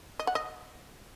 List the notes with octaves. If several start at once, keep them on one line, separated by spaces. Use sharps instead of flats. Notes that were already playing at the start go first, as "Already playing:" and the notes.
D#5
F#5
D#5